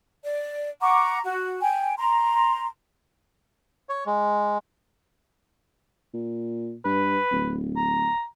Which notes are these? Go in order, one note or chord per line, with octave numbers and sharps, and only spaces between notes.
D5
F#5 A#5 C#6 D6
F#4
G5 G#5
A#5 C6
C#5
G#3
A#2
G2 B4
D1
A#5